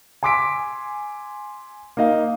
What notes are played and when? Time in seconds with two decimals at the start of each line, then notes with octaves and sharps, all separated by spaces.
0.23 G#5 C6 D6 E6 B6 D7
1.97 A#3 D#4 D#5 F5